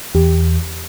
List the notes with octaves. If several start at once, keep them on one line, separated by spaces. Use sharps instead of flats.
E2 G4